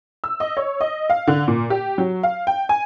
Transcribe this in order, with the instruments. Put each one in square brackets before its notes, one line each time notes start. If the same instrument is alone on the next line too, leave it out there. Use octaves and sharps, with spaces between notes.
[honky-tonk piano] E6
D#5
C#5
D#5
F5
D3
A#2
G4
F#3
F5
G5
G#5